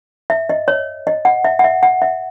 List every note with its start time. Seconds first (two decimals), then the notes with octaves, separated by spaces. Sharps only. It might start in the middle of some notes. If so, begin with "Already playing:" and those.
0.30 E5
0.49 D#5
0.68 C#5
1.07 D#5
1.25 F#5
1.44 E5
1.59 F#5
1.64 E5
1.83 F#5
2.02 E5